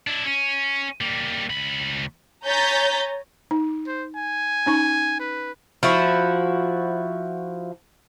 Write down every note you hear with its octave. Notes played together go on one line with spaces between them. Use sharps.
D4 E4
C#4
G3 A#3
C#2 B5
C#5 G#5 A#5 G6 A6 B6
D#4
C5
G#5
C#4 D#4 C#6
B4
F3 E4 F#4